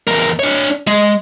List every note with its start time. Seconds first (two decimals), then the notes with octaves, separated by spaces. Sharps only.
0.07 E2 A#4
0.39 D4 C#5
0.87 G#3